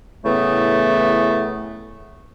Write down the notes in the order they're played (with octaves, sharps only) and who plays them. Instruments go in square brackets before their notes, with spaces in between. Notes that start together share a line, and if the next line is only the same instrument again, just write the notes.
[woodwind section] A2 C#3 E3 A3 B3